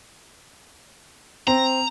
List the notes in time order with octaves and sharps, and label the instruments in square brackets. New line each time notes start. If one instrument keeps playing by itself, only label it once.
[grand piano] C4 [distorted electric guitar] A#5